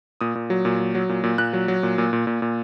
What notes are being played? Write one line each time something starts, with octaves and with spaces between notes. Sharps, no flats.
A#2 D#6
A#2
F#3
A#2
F#3
F#3
A#2
A#2
A#2 F#6
F#3
F#3
A#2
A#2
A#2
A#2
A#2